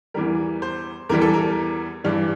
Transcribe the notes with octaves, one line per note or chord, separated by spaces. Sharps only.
E2 E3 G3 A#4
C5
E2 E3 G3 A#4
A4
A#4
G2 E3 G3 D4